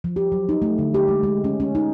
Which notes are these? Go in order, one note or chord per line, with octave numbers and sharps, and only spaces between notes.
F3
G4
F#3
D#4
A3
D3
G4
G#3
G#3
C#4
C#4
D#4